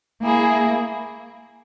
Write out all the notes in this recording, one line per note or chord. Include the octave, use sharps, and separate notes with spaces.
A#3 E4 G#4